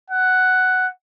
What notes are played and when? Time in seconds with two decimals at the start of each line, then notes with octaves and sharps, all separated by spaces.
0.10 F#5